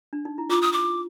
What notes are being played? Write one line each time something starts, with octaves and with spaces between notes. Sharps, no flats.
D4
D#4
E4
F4 D6
D#6
D6